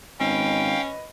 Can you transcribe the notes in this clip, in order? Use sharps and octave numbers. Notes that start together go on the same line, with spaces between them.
G#1 C#4 B4 D#5 F5 G5